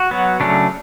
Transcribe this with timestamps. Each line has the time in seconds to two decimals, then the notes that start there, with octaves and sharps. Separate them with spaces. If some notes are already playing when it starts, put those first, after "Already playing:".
Already playing: F#4
0.11 F#3 B3
0.40 C#3 F#3 A3 C#4 D4